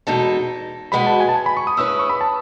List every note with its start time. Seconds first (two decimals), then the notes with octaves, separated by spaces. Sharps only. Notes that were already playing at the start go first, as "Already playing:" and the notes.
0.07 E2 B2 G#3 D#4 A4 A5
0.92 E2 B2 G#3 B3 F#4 B5
1.06 A5
1.20 G#5
1.29 A5
1.35 G#5
1.46 B5
1.57 C#6
1.67 D#6
1.77 G#3 C#4 E4 B4 E6
1.88 D#6
1.99 C#6
2.10 B5
2.21 A5